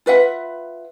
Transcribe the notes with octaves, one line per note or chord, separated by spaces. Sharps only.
F4 B4 E5 F#5